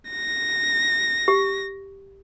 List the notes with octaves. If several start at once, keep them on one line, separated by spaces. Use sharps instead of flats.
A#6
G4